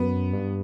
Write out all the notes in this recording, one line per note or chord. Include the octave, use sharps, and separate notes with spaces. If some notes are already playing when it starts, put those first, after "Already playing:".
Already playing: F#2 B3
G2